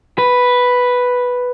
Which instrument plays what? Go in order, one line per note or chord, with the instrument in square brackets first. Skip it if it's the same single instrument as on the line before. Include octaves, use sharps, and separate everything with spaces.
[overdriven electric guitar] B4